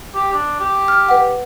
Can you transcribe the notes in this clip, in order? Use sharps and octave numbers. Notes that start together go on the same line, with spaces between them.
G4
D4
G4
F6
B4 F#5